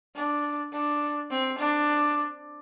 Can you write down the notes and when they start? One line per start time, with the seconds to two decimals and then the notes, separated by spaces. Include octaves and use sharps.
0.15 D4
0.73 D4
1.30 C4
1.58 D4